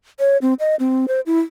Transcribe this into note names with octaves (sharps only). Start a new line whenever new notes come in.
C#5
C4
D#5
C4
C5
E4